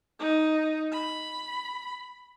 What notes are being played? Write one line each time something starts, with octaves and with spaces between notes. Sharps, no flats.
D#4
B5